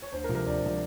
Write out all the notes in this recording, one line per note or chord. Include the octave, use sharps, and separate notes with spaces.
C#5
D2 C5
A#4
C3 F3
A#4
D2 D5
C3 F3